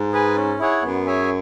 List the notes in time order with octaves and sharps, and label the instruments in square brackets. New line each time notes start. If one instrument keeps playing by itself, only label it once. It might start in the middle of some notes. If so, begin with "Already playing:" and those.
Already playing: [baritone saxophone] G#2
[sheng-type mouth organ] G#4 B4 G#5
C#4
E4 G#4 C#5 F#5
[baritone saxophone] F#2 [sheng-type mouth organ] B3
[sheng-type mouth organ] G#4 C#5 E5 G#5